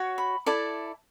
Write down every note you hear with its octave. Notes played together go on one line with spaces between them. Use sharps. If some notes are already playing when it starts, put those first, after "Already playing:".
Already playing: F#4 C#5
B5
E4 A4 D5 A5